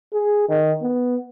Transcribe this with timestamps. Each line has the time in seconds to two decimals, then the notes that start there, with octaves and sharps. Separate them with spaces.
0.13 G#4
0.49 D#3
0.82 B3